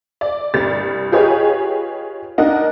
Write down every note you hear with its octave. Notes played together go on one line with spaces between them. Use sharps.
D5
C2 G2 A6
F4 G4 G#4 B4 C#5 D#5
D4 D#4 A#4 D#5 F#5